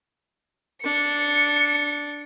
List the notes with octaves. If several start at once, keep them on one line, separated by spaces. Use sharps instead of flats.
D4 C#7